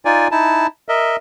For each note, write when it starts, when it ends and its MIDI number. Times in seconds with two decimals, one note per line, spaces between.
0.05 0.28 63
0.05 0.28 65
0.05 0.28 74
0.05 0.28 80
0.31 0.67 63
0.31 0.67 64
0.31 0.67 81
0.89 1.16 70
0.89 1.16 75
0.89 1.16 76